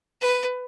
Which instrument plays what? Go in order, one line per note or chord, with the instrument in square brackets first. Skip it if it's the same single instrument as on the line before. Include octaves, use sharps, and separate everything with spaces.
[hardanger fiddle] B4